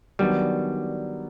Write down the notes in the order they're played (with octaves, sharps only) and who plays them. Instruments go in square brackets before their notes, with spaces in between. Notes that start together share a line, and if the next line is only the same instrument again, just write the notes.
[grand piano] D#3 F#3 B3 D4 [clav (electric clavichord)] G3